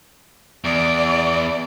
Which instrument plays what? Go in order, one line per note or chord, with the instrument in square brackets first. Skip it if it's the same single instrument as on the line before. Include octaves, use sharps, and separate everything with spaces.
[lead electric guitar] E2 [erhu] D5